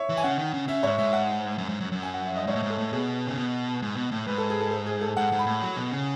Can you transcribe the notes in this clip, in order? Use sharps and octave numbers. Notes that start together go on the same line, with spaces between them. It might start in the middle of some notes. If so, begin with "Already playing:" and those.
Already playing: C#5 E5
E3
G#5
C#3 F#5
D#3
C#3
C#3 E5
G#2 C#5
G#2 E5
F#5
F#2
G#2
F#2
F#2
G#5
F#5
E5
D#5
G#2 C#5
A2
G#2
A4
A2
B2 G#4
C#3
B2
G#2
B2
A2
G#2 B4
A4
G#4
A4
A4
G#4
A4
G#2 F#5
G#2
B5
A2
F#3
B2
C#3